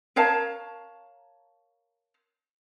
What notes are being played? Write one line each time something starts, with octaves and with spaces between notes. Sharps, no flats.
A#4 C#5 F5 A5